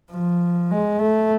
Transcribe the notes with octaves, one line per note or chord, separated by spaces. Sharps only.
F3
G#3
A3